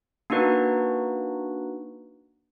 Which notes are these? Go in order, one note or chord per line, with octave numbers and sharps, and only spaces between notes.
A#3 D4 D#4 F#4 B4